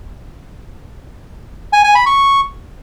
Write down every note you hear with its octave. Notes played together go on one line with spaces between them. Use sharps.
G#5
G#5
B5
C#6